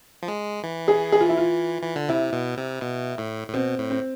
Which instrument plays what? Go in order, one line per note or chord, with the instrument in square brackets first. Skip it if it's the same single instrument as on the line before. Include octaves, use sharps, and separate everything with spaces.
[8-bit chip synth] F3
G#3
E3
[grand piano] G#4
G#4
F4
E4
F4
[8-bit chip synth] E3
D3
[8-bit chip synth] C3 [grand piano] E4
[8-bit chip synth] B2
C3
B2
A2
A2
[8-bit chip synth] B2 [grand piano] C4
[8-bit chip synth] A2
[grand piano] C4